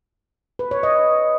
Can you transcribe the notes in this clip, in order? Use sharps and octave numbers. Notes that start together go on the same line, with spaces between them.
B4
C#5
D#5